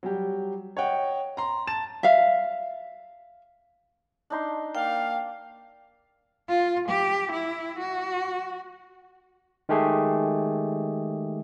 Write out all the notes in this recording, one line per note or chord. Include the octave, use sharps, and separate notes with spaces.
F#3 G3 G4
C#5 D#5 F#5 G5
A#5 C6
A5 A6 E7
E5 F5
D4 D#4 C6
A#3 D5 F5 G5
F4
G4
E4
F#4
D#3 G#3 A3 G4 G#4